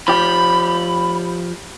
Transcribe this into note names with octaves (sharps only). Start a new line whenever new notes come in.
F3 G4 B5